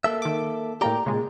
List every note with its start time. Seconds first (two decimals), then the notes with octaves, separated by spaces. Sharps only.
0.04 A#3 A4 E5
0.22 D#3 D6
0.81 A2 A#3 G4 D5 G5 A#5
1.06 A#2 C#3 G#3